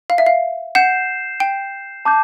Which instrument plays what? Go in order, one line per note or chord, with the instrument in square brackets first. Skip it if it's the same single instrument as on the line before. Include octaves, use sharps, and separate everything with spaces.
[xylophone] F5
E5
F5
[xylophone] F#5 [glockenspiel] G6 C7 E7
[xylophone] G5
[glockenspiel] A5 D6 G6